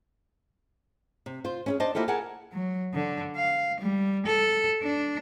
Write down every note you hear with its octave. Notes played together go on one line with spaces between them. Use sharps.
C3
F4 C5
C#4 E4 G#4
D4 C5 D#5 A5
A#3 E4 F4 G4 A4
G#4 A#4 F#5 G#5 A5
F#3
D3
F5
G3
A4
D4